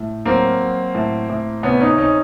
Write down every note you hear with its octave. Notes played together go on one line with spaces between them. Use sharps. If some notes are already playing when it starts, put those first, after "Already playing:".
Already playing: A2
F#3 A#3 C4
F#3
A2
A2
C3 B3 C#4
C#4 D#4
C3 C#4 D#4